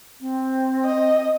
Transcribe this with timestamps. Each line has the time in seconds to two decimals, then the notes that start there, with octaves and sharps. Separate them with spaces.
0.21 C4
0.85 D#5